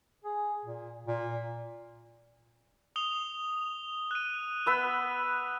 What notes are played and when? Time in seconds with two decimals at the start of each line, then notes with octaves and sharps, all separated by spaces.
0.24 G#4
0.65 A#2
1.07 A#2
2.96 D#6 F7 G7
4.11 F#6 D#7
4.66 B3 B4 E6